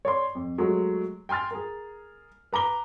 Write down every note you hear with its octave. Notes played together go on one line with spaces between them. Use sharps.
C#5 D5 C6
F2
F#3 G#3 A3
G5 G#5 C6 F6 A6
G#4 A#4
B4 A#5 D6 G7